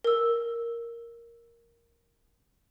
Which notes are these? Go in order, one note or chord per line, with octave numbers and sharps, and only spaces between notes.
A#4 E6